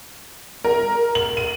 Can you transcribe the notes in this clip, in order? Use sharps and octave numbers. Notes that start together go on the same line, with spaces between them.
A#4
F#7
D#7